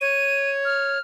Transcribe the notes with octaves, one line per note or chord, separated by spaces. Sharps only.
C#5 D#7
F6